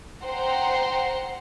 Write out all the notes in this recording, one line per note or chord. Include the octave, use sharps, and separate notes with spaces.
C5 F#5 G5 A#5 C6